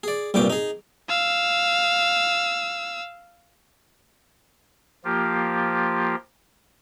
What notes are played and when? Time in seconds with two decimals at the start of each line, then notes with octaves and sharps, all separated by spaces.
0.03 G#4 D5
0.34 C2 G2 A#2 G5 D6
0.50 D#4 G#4
1.09 F5 E6
5.05 F3 A#3 F4 G4